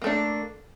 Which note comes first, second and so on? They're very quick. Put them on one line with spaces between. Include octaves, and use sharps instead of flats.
A#3 A3 D4